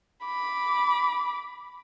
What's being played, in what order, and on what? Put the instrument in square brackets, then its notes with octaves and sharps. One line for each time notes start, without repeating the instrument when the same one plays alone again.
[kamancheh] B5 D6